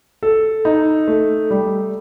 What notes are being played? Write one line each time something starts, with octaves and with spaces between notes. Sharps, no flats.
A4
D#4
A3
G3